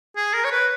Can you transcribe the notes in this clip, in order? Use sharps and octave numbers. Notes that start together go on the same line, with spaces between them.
G#4
A#4
C#5
B4